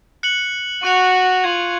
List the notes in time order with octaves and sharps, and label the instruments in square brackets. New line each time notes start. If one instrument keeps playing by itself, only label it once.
[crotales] F#6 C#7 F#7
[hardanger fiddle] F#4 [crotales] C#6 F#6 C#7 F7
[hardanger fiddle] F4 [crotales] G#6 D#7 F#7